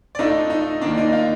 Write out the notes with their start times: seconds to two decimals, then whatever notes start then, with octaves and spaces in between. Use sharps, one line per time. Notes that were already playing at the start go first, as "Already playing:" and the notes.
0.15 D5
0.19 A2 A3 D4 D#4 F4 D#5
0.50 D#4 D#5
0.81 D#2 D#3 A#3 D4 D5
0.97 D#4 D#5
1.13 F4 F5